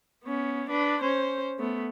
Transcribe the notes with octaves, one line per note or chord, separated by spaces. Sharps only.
B3 C#4
D4 B4
C#4 C5
A3 B3